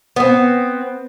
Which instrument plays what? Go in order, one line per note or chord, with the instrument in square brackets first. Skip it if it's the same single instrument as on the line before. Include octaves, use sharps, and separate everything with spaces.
[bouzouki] B3 C4